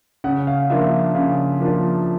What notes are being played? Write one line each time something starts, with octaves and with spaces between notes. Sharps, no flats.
C#3 F#5
F5
F3 A#3 D4 F4 E5
C#3 F5
F3 A#3 D4 F4